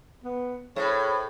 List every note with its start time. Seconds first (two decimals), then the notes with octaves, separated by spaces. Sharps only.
0.24 B3
0.76 A2 G#4 C5 C#5 B5